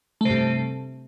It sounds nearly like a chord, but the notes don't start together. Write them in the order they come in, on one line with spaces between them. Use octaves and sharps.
A3 C3 G2